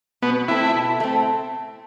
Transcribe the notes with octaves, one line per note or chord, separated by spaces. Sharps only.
B2 B3
A3 C4 E4
B2
A3 C4